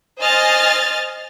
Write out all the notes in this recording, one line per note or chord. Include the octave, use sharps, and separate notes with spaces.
C5 D#5 G#5 F6 A6